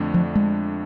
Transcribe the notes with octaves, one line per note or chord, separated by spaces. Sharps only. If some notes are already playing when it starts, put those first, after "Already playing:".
Already playing: F2 D3 A3 D4
F3
G#3